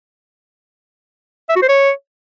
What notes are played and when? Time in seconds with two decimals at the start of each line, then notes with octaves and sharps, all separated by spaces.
1.49 E5
1.56 F#4
1.62 C5
1.69 C#5